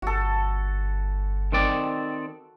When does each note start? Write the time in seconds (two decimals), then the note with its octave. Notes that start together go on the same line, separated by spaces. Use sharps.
0.02 G1 F#4 A4
1.52 D#3 C4 D5